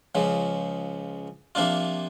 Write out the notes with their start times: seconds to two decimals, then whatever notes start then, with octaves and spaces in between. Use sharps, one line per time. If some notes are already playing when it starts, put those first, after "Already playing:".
0.15 C#2 C#3 F3
1.55 C3 F3 A#3 D4 F4